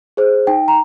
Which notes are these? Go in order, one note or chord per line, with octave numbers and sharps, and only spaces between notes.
G#4 C5
D#4 G5
A#5